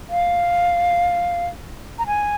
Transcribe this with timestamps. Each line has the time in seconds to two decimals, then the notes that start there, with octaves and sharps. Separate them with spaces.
0.10 F5
1.99 A#5
2.07 G#5